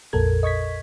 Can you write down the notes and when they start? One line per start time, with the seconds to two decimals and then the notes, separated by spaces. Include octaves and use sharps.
0.13 A#1 F2 A#2 A4 A#4 G#6
0.43 D#5 C#6 G#6 B6